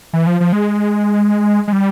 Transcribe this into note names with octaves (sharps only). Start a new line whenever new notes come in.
E3
F3
F3
G#3
G#3
G3